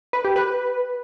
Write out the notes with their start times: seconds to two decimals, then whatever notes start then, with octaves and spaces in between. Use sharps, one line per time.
0.13 B4
0.25 G4
0.36 B4